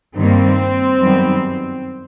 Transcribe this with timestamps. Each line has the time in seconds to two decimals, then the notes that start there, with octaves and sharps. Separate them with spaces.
0.15 G2 D#3 G3 A#3 C4
0.99 F#2 D#3 G3 B3